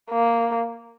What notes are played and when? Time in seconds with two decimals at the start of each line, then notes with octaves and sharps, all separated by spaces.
0.10 A#3